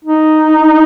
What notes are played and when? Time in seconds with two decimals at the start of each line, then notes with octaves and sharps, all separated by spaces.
0.04 D#4